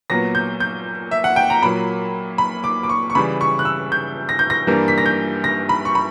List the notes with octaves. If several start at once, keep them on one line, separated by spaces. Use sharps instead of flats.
A#2 F#3 B3 A#6
G6
G6
E5
F#5
G5
A#5
A#2 F#3 A#3 B5
B5
D6
D6
C#6
C#6
C#3 E3 G3 B5
C#6
F#6
E6
G6
A#6
G6
A#6
G2 E3 G3 A#3
B6
A#6
G6
A#6
B5
C#6
B5